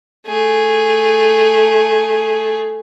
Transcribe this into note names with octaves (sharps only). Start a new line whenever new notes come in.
A3 G#4